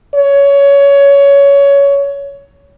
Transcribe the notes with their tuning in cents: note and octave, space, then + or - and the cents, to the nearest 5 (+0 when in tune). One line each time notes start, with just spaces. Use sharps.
C#5 +20